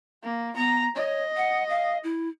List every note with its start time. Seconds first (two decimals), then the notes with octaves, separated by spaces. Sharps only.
0.23 A#3
0.56 B3 A#5
0.95 C#5 D#5
1.37 F#5
1.69 F5
2.04 E4